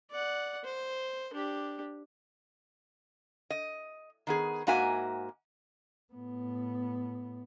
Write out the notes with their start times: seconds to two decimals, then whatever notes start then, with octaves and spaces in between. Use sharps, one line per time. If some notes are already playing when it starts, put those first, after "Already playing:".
0.10 D5 F#5
0.64 C5
1.33 D4 G4
3.50 D#5
4.27 D#3 B3 G#4
4.67 G#2 A#3 F#4 E5 G#5
6.13 A2 B3